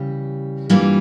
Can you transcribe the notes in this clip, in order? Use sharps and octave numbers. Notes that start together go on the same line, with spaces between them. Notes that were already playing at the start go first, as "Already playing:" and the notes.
Already playing: C#3 E3 G3 G4
G2 E3 G3 A#3 F4